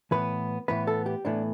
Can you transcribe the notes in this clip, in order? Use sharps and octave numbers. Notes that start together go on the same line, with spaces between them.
A2 E3 B3 B4
A2 E3 B3 B4
A4
G4
A2 E3 B3 D4